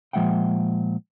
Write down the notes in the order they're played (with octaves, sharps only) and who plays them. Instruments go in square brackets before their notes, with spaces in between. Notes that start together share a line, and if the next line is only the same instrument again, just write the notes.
[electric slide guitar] A#2 F3 G#3 E5 F#5 G5